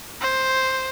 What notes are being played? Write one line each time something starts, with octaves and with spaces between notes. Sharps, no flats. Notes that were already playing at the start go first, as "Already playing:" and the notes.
C5